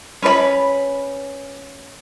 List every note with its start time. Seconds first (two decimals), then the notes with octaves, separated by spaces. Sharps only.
0.22 C#4 B4 C#5 B5